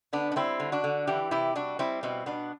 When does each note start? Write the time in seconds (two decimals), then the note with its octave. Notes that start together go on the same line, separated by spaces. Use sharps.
0.13 D3 B3 D4
0.32 D4
0.36 G3 C4 E4
0.60 D3
0.72 D4 F#4
0.84 D3
1.07 E3 E4 G4
1.31 C3 E4 G4
1.55 G3 D4 F#4
1.79 G3 C4 E4
2.03 B2 C4 E4
2.26 B2 B3 D4